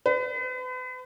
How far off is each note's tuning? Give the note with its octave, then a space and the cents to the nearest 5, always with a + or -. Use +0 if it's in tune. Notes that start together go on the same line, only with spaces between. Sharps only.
B4 +40